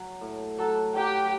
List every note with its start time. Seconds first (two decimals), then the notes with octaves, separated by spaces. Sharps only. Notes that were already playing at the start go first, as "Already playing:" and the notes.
Already playing: F#3
0.21 A2
0.58 F#3 A4
0.96 F#3 G4